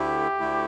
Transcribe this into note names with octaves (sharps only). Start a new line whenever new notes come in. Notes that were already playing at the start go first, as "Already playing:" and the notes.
Already playing: D2 D3 A3 E4 G4
D2 D3 A3 E4